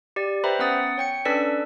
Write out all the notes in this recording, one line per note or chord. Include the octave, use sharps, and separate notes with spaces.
G4 D5
B4 C5 E5 G5 A#5 B5
B3 C#4 F#5 D#6 A6
C#5 G5 C#7
C#4 D4 A4 B4 D5 B6